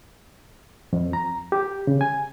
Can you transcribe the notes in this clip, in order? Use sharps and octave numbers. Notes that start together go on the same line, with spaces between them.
F2
A#5
G4
C#3
G#5